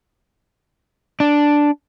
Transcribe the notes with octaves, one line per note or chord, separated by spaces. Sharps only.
D4